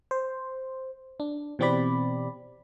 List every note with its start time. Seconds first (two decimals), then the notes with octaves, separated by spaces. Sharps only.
0.11 C5
1.20 D4
1.59 B2 E3 C4 G4 D5 B5